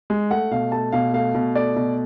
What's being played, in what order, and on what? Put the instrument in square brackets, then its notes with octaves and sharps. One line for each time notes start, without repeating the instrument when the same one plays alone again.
[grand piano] G#3
A3 F#5
B2 F5
A3 A5
B2 F5
A3 F5
B2
A3 D5
B2